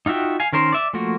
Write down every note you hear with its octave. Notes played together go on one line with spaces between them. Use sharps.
D#4 F4 F#4 E5 G5
F5 G#5
D#3 C#4 A#4 C5
D5 E5
F3 A3 A#3 F#4